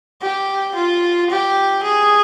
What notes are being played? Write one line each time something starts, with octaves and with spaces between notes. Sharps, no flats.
G4
F4
G4
G#4